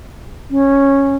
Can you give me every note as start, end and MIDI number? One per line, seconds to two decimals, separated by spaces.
0.50 1.16 61